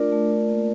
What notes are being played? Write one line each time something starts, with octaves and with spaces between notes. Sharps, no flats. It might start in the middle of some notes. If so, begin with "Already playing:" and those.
Already playing: A3 D4 F4 A#4 D5
A3
F4
A#3